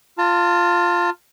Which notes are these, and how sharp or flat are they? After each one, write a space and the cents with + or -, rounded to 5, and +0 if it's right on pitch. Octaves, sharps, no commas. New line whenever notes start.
F4 +0 A5 +35